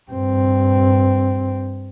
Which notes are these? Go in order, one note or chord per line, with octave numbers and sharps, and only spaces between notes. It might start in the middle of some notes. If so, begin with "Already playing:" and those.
G2 C4